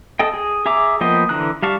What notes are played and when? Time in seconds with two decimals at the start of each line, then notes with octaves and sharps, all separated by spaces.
0.19 A4 D#5 G5
0.34 G#4
0.66 G#4 E5 A#5 D6
1.01 F3 A#3 B3 D#5 G5
1.29 D3 E3 A#5 F#6
1.63 G3 F5 A5 C#6